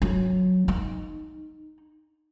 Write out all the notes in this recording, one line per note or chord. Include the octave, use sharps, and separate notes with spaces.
F#3
D#4